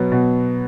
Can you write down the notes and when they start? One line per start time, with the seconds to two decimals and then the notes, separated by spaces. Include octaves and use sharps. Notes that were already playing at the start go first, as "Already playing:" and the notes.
Already playing: B2 F#3 B3
0.12 B2